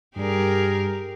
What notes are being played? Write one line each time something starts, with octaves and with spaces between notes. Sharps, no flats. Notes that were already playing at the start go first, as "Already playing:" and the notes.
G2 G3 G4 G#4 A#4